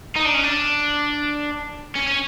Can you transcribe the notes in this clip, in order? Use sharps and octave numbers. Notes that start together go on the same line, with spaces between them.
D#4
D4
C#4
D4
C#4
C#4